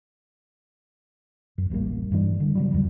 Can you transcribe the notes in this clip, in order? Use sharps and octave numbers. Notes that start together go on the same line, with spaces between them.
F#2
D1 A1 G3 A#3
G2 E3 G3
D3
C#3 F#3 G3
E2 G2 F#3 G3